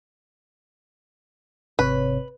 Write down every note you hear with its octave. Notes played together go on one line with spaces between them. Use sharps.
G#1 C3 B4 C#5